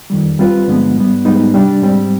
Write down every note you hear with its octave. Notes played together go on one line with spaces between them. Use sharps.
F2 D#3 G3
G3 C4 F4 B4
G2 D3 F3 G#3 B3
G#2 G3 B3
G#2 G3 B3 D#4
C3 G3 D4
G#2 G3 C4